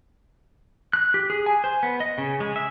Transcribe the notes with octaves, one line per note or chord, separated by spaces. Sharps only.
F#6
G4
G#4
G#5
C5
B3
D#5
C#3
G#3
E5